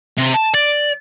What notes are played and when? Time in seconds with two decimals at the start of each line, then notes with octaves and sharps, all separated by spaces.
0.17 C3
0.34 A5
0.54 D5